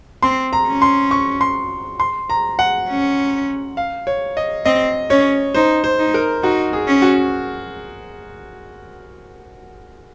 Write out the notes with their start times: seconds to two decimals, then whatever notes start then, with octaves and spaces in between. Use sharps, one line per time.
0.22 C4 C6
0.53 A#5
0.68 C#4
0.82 C6
1.11 C#6
1.41 C6
2.00 C6
2.30 A#5
2.59 F#5
2.88 C#4
3.77 F5
4.07 C#5
4.37 D#5
4.65 C4 D#5
5.10 C#4 C#5
5.54 D#4 C5
5.84 C5
5.99 D#4
6.14 A#4
6.43 D#4 F#4
6.73 G#4
6.87 C#4
7.02 F#4